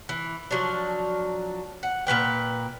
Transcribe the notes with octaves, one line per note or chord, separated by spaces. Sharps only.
E3
F3 F#3 D4
F#5
A#2 G3 B4 G5